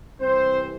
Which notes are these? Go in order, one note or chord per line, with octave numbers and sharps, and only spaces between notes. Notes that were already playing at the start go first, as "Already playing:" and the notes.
C2 C3 E3 C4 C5